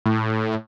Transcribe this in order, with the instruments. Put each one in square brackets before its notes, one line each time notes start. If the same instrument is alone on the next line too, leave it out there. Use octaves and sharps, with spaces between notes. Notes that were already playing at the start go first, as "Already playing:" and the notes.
[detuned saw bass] A2